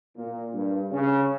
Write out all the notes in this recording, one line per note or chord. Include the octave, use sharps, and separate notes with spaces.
A#2
G2
C#3